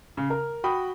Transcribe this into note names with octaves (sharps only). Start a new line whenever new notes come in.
C#3
A#4
F#4 G5 B5 D#6